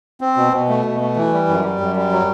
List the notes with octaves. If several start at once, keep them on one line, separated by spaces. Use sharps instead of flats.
C4
B2
B2
A3
B2
A3
E3
G3
F#2
G3
F#2
G3
F#3